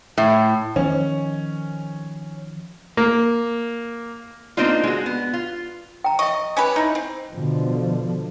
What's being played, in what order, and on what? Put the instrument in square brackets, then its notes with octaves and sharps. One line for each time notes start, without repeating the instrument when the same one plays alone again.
[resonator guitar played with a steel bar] A2
[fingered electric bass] D#3 F3 [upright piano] C#4
[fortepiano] A#3
[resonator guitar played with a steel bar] A#3 C4 D4 D#4 F4
G#3 F#4
B3
F4
[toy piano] G5 A#5
[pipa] D#5 [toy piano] E5 C#6
[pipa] C#4 G4 B4
D#4 E4
C4
[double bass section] B2 D3 F3